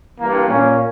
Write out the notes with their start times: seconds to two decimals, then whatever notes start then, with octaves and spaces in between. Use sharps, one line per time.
0.19 G2 E3 A#3
0.48 A#2 A#3 C#4